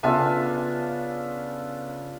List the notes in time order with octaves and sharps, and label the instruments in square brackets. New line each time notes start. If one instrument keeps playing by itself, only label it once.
[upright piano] C#3 [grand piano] B3 E5 G#5 [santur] D4 F4 A4